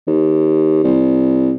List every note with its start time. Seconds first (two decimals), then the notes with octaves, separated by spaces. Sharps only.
0.08 D#2
0.84 C2